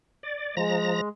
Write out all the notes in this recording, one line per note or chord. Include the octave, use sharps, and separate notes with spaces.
D5
F3 G#3 A#5 A#6